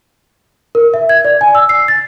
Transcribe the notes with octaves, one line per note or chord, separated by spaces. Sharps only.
A#4
E5
G#6
D5
G#5
E6
C7
A6